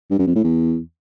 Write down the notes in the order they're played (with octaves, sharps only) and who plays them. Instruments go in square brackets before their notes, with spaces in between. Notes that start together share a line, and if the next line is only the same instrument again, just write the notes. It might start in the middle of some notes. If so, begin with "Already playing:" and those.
[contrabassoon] G2
F#2
F2
A2
E2